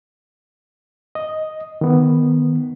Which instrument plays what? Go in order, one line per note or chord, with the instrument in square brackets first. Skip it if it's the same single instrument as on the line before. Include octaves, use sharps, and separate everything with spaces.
[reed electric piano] D#5
D#3 B3